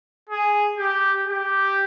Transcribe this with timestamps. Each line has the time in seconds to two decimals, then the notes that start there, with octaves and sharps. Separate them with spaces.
0.29 G#4
0.78 G4
1.27 G4